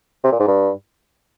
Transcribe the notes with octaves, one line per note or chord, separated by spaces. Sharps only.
C3
A#2
G#2
G2